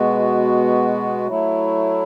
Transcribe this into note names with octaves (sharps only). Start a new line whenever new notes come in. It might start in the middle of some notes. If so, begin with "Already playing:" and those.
Already playing: B2 G#3 B3 F#4
F#3 A3 E4